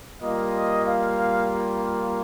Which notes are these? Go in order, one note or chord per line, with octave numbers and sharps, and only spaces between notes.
G3 A#3 F4 D#5
F5